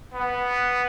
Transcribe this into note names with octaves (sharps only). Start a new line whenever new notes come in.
B3